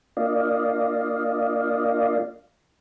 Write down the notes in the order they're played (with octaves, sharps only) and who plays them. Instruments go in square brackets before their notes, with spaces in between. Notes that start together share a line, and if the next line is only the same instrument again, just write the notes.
[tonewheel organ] A#3 D4 F4 D5 D#5 F5